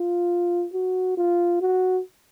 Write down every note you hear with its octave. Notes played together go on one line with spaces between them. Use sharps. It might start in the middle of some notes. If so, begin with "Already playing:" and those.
Already playing: F4
F#4
F4
F#4